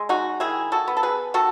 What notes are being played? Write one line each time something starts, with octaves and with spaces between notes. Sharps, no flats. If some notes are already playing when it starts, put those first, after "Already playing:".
Already playing: G#3
D#4 F#4
D#3 E4 G#4
F#4 A4
B3
A4
G#4 B4
D#3 F#4 A4